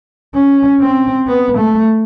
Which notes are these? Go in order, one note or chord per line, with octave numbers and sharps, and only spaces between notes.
C#4
C4
B3
A3